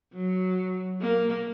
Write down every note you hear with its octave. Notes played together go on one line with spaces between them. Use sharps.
F#3
A#3